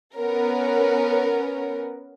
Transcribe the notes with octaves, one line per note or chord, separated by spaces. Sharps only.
B3 C#4 A#4